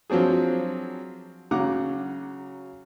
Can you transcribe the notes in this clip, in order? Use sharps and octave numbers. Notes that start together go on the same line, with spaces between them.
F3 F#3 C4 D4 G#4
C#3 F#3 F#5 A#5 D6